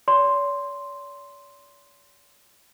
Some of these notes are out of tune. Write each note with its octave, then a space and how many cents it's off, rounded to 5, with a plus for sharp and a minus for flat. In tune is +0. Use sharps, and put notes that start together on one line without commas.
C#5 +45 C6 +0